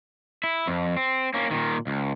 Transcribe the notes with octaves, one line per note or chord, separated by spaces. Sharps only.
E4
F2
C4
A#3 C#4
A#2 D#3
C#2